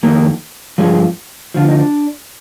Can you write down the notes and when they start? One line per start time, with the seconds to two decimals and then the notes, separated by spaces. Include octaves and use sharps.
0.03 F2 D#3 A#3
0.78 G2 F3 G#3
1.54 D2 D3 F3 F4
1.68 D#4
1.79 D4